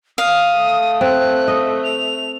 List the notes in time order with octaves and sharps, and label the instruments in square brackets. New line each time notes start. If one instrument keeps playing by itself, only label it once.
[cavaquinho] F5 [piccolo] D#6
[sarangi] A3
[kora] C4 [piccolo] F#6
[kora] D#5
[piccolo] F7